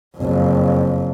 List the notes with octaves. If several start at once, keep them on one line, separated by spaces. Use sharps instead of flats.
F#1 F2